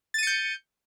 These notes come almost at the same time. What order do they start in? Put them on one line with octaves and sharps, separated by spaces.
A6 D#7 C#7 G6